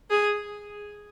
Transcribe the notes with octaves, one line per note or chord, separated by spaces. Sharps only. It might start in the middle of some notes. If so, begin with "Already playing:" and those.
G#4